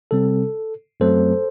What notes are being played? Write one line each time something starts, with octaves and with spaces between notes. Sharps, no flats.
C3 G3 C4 A4
F#2 F#3 A3 C4 A4 C5